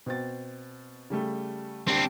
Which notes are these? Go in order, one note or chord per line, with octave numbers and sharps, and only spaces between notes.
B2 C4 A6
C#3 G3 A3
D2 G3 C4 D4